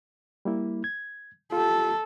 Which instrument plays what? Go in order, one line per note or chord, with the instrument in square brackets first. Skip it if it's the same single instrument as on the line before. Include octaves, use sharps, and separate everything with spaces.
[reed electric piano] G3 A#3 E4
G#6
[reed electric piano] F4 G4 [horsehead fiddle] A4